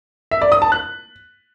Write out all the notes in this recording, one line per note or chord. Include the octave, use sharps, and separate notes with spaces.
E5
D5
D#6
A5
F#6